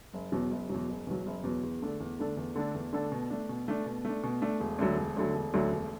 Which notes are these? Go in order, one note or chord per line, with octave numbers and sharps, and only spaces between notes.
F#1
E2 B2 F#3
F#1
E2 B2 F#3
F#1
E2 B2 F#3
F#1
E2 B2 F#3
E2
D3 A3 D4 A4
E2
D3 A3 D4 A4
E2
D3 A3 D4 A4
E2
D3 A3 D4 A4
B2
A3 D4
B2
A3 D4
B2
A3 D4
B2
A3 D4
E1
D2 D3 F#3
E1
D2 D3 F#3
E1
D2 D3 F#3
E1